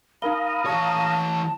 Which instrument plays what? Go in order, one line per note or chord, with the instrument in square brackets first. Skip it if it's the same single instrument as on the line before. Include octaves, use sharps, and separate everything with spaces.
[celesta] D#4 A#4 G7 [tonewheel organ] F5 A#5 D#6 [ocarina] B5
[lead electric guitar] E3 C#5 [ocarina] A5 [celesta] C#6